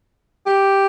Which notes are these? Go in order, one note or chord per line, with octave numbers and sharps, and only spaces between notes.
G4